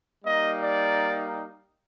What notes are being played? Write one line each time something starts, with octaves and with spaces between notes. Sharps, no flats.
G3 A#3 D#4 D#5
D5